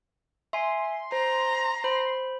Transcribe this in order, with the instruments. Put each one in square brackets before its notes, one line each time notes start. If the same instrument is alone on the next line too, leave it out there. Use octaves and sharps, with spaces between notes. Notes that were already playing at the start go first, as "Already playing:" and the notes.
[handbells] E5 G#5 [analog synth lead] C6
[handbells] C5 [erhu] A#5
[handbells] C5 B5